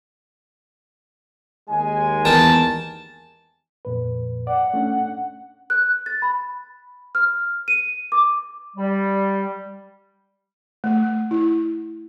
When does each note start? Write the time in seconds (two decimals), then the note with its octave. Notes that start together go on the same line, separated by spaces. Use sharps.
1.70 D#2 G#3 G#5
2.25 E2 A#4 G5 A5
3.85 F2 A#2 B4
4.47 D5 F#5
4.74 A3 C#4 D4
5.70 F#6
6.06 A6
6.22 B5
7.15 F6
7.68 D#7
8.12 D6
8.77 G3
10.84 A3
11.31 E4